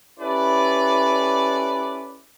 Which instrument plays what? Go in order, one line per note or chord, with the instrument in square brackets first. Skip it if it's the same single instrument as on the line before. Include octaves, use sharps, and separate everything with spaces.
[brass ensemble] C#4 E4 G4 A4 B4 D5